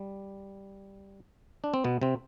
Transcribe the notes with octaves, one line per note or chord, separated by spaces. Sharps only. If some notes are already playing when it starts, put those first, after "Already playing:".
Already playing: G3
D4
C4
B2 B3
C3 C4